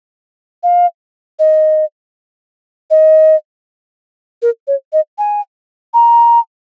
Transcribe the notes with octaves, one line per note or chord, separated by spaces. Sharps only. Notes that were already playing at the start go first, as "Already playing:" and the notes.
F5
D#5
D#5
A#4
C#5
D#5
G#5
A#5